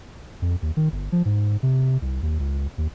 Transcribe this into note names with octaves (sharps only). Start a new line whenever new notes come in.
F2
D#2
D#3
G1
F3
G#2
C3
C2
D#2
C#2
D#2